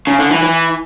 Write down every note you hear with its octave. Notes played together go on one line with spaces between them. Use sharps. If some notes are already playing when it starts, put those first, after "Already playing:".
C#3
D3
E3
E3